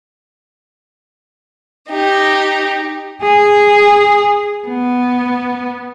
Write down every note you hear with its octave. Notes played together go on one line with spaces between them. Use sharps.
D#4 G4
G#4
B3